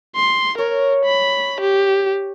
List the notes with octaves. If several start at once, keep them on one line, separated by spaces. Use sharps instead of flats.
C6
A#4 C#5
B5
G4